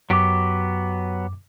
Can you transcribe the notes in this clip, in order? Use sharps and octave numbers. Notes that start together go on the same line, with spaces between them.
F#2 F#3 B3 G4 D6